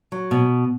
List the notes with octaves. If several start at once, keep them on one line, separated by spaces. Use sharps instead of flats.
F#3
B2